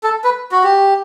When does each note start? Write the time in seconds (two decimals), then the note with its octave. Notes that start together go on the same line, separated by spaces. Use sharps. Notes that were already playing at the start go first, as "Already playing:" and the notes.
0.03 A4
0.24 B4
0.52 F#4
0.64 G4